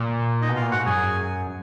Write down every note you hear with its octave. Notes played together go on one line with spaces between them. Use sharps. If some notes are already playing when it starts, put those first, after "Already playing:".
Already playing: A#2
D#4 D#5
B2
A#2 F4 F5
G#2 F#4 F#5
F#2 G#4 G#5